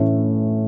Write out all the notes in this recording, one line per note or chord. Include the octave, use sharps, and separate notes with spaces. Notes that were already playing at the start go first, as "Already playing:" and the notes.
Already playing: A2 E3 A3 C#4